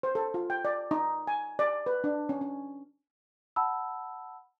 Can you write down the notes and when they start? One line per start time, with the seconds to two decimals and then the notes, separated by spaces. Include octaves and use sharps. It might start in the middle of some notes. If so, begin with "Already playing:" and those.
0.03 C5
0.15 A4
0.34 F4
0.50 G5
0.65 D5
0.91 D#4
1.27 G#5
1.59 D5
1.86 B4
2.04 D4
2.29 C#4
2.41 C#4
3.56 F#5 A5 B5 E6